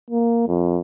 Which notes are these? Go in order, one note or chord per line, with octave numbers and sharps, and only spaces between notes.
A#3
F2